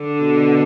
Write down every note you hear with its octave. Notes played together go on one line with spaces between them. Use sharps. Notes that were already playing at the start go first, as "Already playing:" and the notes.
Already playing: D3
B2